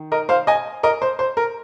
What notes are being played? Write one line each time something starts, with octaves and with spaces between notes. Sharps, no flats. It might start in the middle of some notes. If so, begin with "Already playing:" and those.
Already playing: D#3
A#4 D#5
C5 F5
D#5 G#5
A#4 D#5
C5
C5
A#4